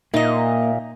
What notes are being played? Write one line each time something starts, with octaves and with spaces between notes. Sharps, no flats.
A#2 A#3 D#4 D#5 E5